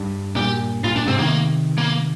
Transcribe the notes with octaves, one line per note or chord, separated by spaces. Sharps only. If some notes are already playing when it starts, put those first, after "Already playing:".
Already playing: G2
G2 A#2 G4
G2 A#2 F4
G2 A#2 D4
G#2 C3 C4
C3 D#3 A#3
A#3